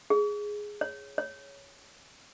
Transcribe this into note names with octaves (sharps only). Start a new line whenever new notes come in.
G#4
C#5
C#5